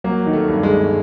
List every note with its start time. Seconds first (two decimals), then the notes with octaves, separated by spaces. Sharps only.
0.04 F#3 A#3
0.26 D#3
0.33 A3
0.48 G2
0.63 G#3
0.71 G1